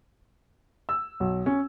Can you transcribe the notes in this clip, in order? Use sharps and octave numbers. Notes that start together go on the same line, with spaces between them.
E6
B1
C#4